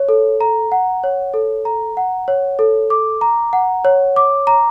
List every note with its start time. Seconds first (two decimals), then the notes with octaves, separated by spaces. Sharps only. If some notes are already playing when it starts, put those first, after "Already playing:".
Already playing: C#5
0.09 A4
0.41 A#5
0.72 F#5
1.03 C#5
1.34 A4
1.65 A#5
1.97 F#5
2.28 C#5
2.59 A4
2.90 D6
3.21 A#5
3.53 F#5
3.85 C#5
4.16 D6
4.47 A#5